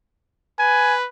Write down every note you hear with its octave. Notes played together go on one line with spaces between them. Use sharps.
B4 G#5